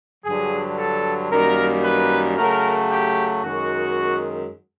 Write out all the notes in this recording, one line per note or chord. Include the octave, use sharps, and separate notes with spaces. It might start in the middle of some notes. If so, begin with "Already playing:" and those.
G2 D3 F#3 G#4
A4
F#2 D#3 G3 A#3 A#4
B4
C#3 F#3 A3 A#4
G4
F#2 D#3 G#3 F#4